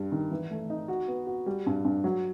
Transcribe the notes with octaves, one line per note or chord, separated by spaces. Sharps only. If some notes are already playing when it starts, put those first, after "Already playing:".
Already playing: G2 G3
D#3
E3
A3
D#4
F#4
B3
F#4
G3
G2
G2
F#3